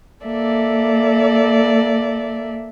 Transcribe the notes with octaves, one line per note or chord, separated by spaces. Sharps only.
A#3 A4 D5 E5